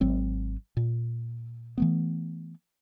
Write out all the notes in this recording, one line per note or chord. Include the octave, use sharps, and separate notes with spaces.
G#1 F#3 C4
A#2
E3 A3 B3